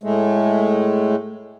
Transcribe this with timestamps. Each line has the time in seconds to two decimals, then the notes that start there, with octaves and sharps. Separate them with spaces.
0.03 A2 G#3 A3